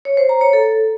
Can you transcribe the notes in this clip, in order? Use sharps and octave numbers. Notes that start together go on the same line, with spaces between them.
C#5
C5
A#5
C#5
A4